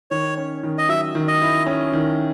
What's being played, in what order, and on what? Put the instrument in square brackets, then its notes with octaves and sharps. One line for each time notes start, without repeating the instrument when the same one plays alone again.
[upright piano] D#3 [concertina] C#5
[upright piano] C#4
D#3
[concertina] D#5
[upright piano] F#3 [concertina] E5
[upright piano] D#3
[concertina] D#5
[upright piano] E4
C#4
D#3